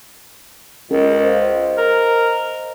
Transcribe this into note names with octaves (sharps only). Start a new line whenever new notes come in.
C#2 C#4 G#4 A#4
C5 D#5 F5
A#4